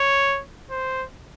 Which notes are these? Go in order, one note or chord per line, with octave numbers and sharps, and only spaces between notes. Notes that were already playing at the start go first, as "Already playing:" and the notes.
Already playing: C#5
C5